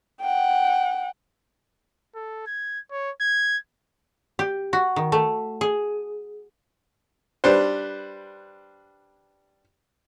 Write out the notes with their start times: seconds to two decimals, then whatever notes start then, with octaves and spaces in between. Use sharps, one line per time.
0.21 F#5 G5
2.15 A4
2.47 G#6
2.91 C#5
3.21 G#6
4.39 G4
4.73 F#4
4.96 D#3
5.12 A3
5.61 G#4
7.44 G3 D4 B4 C5